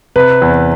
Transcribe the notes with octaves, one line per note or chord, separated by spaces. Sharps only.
C3 B4
E2